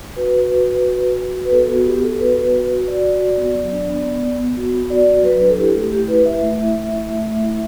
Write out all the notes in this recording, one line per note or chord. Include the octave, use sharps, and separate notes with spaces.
F#4 B4
F#4
F#4
F#4
F#4
F#4
F#4
F#4
B4
B3 A4
B3 F#4
B3 G4
B3 A4
F#4 B4
B3
F#4
F#4
F#4 D5
F#4
F#4
B3
F#3
D4
B3
B3
B3
B3
F#4
B3
F#4 D5
F#4
F#3 B4
D4
A4
E4 G4
A3
A3 G4
E4 B4
E4 E5
A3
E4
A3
E4
A3
A3
E4